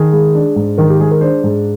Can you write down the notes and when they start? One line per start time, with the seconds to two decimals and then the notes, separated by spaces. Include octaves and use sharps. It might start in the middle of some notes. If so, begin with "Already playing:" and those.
Already playing: D#3 G#4
0.12 G#3
0.35 D4
0.56 G#2
0.78 D#3 A#4
0.90 G4
1.00 G#3 G#4
1.11 A#4
1.21 D4 C5
1.44 G#2